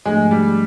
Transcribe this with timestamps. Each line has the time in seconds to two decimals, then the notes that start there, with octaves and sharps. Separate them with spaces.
0.05 G#2 F3 G#3 A3 D4
0.31 G3